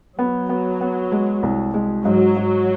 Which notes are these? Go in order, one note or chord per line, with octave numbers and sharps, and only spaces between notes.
F#3 B3
B3
B3
G#3
C2
G#3
G#2 F#3
G#2